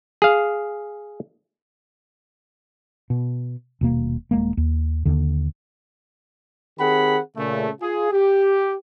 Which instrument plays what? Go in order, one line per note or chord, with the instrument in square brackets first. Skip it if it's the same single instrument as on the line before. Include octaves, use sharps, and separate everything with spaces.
[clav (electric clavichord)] G#4 F5
[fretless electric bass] B2
D#1 B2 A#3
D#1 G#3 A#3
D#2
D#2 D3
[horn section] D#3 C4 G4 G#4 F#5 B5
A#2 C#3 A3
F4 G#4
G4